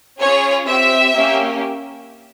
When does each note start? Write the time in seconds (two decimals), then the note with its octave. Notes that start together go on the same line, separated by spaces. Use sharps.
0.19 C#4 F4 G#4 C#5
0.66 C4 G4 E5
1.13 A#3 C#4 G4